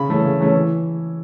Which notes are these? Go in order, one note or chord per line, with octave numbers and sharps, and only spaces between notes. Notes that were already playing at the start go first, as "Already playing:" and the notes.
Already playing: C#3 B5
E3 A3 C#4
C#3
E3 A3 C#4
E3